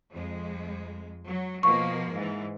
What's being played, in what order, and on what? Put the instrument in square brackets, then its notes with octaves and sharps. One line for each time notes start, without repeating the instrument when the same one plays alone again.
[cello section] F2 G#3
F#3
[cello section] B2 F3 A#3 [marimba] C#6
[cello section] G#2 E3